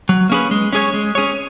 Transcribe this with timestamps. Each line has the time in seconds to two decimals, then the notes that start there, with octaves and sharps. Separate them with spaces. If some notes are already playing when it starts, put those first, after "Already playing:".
0.09 F#3
0.30 A#3 C#4 G#4 B4
0.51 G#3
0.73 C#4 G#4 C#5
0.94 G#3
1.15 C#4 G#4 C#5